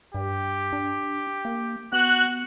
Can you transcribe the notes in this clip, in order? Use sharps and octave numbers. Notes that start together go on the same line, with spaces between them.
G2 G4
D4
A#3
B3 F#4 F#6